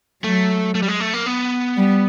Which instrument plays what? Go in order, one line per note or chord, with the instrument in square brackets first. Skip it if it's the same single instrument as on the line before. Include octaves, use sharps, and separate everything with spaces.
[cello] F#3 [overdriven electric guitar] A3
[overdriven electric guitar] A3
G3
G#3
A3
A#3
B3
[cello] G3